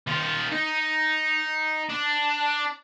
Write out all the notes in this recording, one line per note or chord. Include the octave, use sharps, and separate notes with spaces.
D#3 F4
D#4
D4